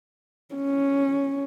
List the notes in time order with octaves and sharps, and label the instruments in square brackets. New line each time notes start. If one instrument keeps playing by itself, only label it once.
[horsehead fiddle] C#4